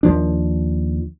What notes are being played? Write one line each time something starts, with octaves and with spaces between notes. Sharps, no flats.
D#2 F3 D4